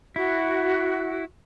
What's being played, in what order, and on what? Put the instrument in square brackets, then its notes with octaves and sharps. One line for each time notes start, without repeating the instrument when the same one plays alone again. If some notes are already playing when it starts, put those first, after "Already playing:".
[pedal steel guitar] E4 [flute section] F#4